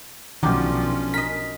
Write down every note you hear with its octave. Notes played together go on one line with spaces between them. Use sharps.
B1 D#3 F3 F#3 C#4 D4 G4
A#4 D#5 B6